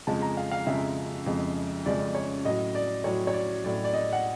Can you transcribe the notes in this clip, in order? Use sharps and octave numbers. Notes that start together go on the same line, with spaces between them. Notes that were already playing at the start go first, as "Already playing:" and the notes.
F2 C#3 F3 G#3 A5
A#5
F5
F5
F2 C#3 F3 G#3 E5
F2 C#3 F3 G#3
F2 C#3 F3 G#3 D5
C#5
A2 F#3 D#5
D5
A2 F#3 C#5
C#5
D5
A2 F#3 D5
D5
D#5
F#5